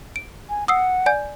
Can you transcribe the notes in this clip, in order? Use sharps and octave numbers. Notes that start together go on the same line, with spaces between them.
D7
G#5
F#5 D#6 E6 C7
D5 G#5 G6